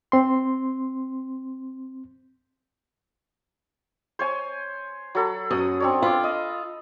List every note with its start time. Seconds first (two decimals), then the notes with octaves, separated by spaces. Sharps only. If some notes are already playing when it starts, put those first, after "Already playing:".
0.12 C4 C6
4.19 C5 C#5 G#5
5.15 F#3 A4 B5
5.51 F#2 C#4 D#6
5.80 C4 D4 C#5
6.02 F4 B5 D6
6.24 D#5